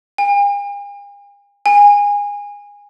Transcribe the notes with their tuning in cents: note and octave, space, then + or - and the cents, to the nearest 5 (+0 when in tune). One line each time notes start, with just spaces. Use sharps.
G#5 -45
G#5 -20